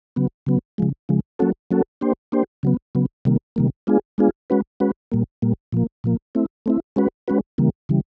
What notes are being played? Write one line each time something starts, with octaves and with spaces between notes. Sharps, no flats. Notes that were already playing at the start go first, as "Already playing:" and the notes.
C#3 F#3 B3
C#3 F#3 B3
C#3 F3 G#3
C#3 F3 G#3
F#3 A#3 C#4 F#4 A4
F#3 A#3 C#4 F#4 A4
A#3 D4 G4 C5
A#3 D4 G4 C5
C#3 F#3 B3
C#3 F#3 B3
C3 D#3 G3 A#3
C3 D#3 G3 A#3
G#3 B3 D4 F4 G#4
G#3 B3 D4 F4 G#4
G#3 C#4 F#4 B4
G#3 C#4 F#4 B4
A#2 G3 A#3
A#2 G3 A#3
A#2 F3 A#3
A#2 F3 A#3
A3 C4 E4
A3 C4 E4
G#3 C#4 F#4 B4
G#3 C#4 F#4 B4
C#3 E3 G3 A#3
C#3 E3 G3